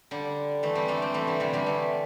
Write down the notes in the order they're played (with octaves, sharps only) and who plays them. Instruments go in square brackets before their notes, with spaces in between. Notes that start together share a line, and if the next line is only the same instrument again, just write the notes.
[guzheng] D3 G3
E3 A3
G3 C4
A3 D4
G3 C4
E3 A3
D3 G3
C3 E3
D3 G3
E3 A3